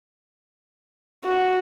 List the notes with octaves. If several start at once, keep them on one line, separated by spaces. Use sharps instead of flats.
F#4